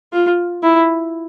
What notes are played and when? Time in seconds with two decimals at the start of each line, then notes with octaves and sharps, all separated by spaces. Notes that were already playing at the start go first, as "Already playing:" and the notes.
0.13 F4
0.63 E4